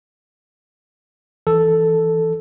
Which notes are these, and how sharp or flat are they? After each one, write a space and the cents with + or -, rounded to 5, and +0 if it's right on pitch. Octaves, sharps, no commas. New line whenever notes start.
E3 +0 A4 +0